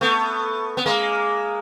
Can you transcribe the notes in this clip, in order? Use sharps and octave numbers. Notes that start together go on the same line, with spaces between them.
A3 B3
B3
G#3 A#3